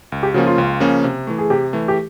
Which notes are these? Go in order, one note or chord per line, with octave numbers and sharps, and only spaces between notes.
C#2
G4
C#3 F3 A#3 C#4 F#4
F4
C#2
C#3 F3 A#3 C#4
C3
E3 A3
G#4
C3 G4
E3 A3
G4